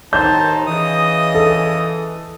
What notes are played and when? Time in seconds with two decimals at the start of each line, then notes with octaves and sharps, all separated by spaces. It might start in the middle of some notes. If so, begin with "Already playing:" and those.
0.13 D#2 A2 D#3 D#4 C5 A5 G6
0.67 C#3 E3 D#5 D#6
1.35 A4